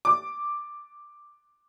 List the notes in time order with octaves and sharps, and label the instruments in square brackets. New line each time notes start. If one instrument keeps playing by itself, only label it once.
[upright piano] D6